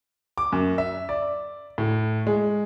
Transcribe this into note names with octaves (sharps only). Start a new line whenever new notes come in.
D6
F#2
E5
D5
A2
G#3